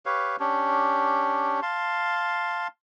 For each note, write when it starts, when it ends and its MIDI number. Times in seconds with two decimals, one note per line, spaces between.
0.06 0.36 67
0.06 0.36 71
0.06 0.36 73
0.06 0.36 77
0.40 1.60 61
0.40 1.60 62
0.40 1.60 67
1.62 2.67 77
1.62 2.67 81
1.62 2.67 84